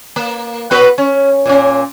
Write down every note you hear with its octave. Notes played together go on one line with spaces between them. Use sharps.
A#3
B3 F#4 B4
C#4
A#2 C#4